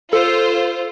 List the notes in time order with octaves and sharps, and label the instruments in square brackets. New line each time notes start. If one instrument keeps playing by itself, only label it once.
[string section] F4 C5 [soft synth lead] A4